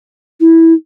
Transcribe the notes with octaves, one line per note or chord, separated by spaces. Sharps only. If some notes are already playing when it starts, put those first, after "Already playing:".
E4